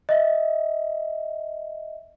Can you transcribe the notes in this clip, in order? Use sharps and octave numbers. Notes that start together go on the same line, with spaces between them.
D#5 E5